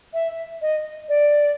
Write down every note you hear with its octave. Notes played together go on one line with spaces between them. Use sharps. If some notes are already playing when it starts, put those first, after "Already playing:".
E5
D#5
D5